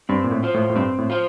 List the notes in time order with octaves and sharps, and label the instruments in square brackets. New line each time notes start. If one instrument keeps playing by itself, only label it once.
[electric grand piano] G2 [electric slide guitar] C4
[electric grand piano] A#2
A2
[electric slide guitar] F4 C5
[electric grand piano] A2
A2
[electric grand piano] G2 [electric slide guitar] C4
[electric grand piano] A2
[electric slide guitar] F4 C5